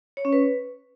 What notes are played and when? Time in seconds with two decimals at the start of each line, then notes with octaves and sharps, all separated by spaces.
0.17 C#5
0.25 C#4
0.33 B4